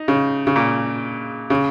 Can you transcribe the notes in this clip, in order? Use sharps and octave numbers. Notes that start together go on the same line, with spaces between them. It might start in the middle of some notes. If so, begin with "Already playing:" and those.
Already playing: D#4
C#3
C#3
A#2
C#3